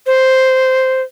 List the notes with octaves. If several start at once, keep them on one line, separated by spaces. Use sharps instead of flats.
C5